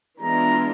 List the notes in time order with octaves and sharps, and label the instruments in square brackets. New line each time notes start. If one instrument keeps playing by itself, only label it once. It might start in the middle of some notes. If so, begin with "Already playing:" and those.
[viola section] E3 G#3 B3 D4 F4 [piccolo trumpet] A#5